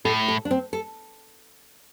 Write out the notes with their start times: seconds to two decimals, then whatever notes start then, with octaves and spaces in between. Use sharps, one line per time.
0.05 A2 A4
0.28 A4
0.45 D4
0.51 C4
0.73 A4